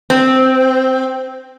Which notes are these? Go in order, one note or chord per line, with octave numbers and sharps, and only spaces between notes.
C4